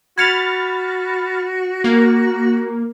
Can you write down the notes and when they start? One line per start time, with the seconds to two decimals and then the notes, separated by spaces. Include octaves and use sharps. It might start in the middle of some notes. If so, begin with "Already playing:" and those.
0.18 F#4 B5 F6 G#6 A6 C#7 F7
1.84 A#3